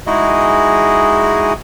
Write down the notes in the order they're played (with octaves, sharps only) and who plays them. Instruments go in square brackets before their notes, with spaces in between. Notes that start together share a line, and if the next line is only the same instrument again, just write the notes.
[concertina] G#3 D#4 E4 F#4 G#4 D#5